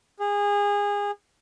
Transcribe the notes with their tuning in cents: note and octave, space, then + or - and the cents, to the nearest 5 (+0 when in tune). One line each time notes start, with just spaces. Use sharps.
G#4 -25